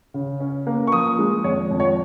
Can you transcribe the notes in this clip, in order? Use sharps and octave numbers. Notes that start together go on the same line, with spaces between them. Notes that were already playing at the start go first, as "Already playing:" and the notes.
C#3
C#4
A#3
C#6
F3 D#6
G#3
F2 C#5
F2
C#5